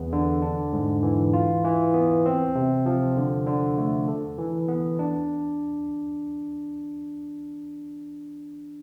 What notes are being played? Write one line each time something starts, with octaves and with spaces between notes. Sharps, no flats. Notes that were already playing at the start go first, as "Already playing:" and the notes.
Already playing: E2 B3
D3
D4
G#2
E3
F4
E3
B3
C4
C3
F3
D3
D3
A3
A4
E3
B3
D4